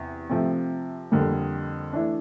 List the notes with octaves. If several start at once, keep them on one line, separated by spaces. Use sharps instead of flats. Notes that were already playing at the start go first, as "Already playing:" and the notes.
Already playing: E2 C3
C3 F3 A3 C4
F2 D3 G3 A#3
E3 A3 D4